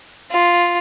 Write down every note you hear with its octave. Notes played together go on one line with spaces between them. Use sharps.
F4